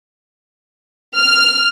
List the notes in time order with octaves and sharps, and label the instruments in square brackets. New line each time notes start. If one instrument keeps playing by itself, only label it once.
[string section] F6